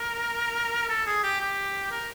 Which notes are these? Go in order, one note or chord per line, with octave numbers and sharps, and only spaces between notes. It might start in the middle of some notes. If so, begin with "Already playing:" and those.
Already playing: A#4
A4
G#4
G4
G4
A#4